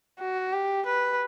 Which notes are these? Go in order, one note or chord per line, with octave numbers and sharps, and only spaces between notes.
F#4
G4
B4